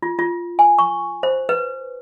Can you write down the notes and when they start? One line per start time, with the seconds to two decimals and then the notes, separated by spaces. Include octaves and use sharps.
0.03 F4
0.19 F4
0.59 G#5
0.79 C#6
1.23 C5
1.49 B4